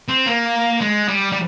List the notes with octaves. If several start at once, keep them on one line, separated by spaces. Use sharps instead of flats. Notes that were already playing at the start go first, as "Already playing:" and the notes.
C4
A#3
G#3
G3
G3